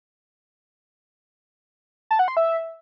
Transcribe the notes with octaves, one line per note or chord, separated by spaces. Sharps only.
A5
F#5
C6
E5